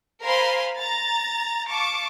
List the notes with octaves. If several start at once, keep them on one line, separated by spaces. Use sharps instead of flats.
A#4 C5 F5 G#5 B5 C6
A#5 A6
F5 A5 C#6 D6